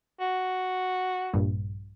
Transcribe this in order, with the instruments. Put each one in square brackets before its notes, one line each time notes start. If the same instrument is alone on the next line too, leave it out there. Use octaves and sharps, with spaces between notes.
[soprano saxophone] F#4
[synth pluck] A#1 G2